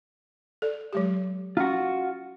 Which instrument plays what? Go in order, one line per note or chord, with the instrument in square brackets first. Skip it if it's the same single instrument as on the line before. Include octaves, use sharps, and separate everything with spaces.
[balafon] A4 D5
F#3 G#3 G4
[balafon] C#4 [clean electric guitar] F4 F#4